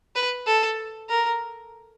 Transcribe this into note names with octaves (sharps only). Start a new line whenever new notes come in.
B4
A4
A#4